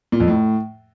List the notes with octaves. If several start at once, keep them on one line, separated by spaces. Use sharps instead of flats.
A#2
F2
A2